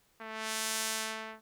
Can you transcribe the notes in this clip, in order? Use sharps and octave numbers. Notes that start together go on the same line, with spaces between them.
A3